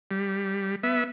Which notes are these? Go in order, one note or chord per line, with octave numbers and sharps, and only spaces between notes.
G3
B3 E5